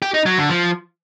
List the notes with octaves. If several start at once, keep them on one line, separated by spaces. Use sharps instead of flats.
G4
D#4
F#3
D3
F3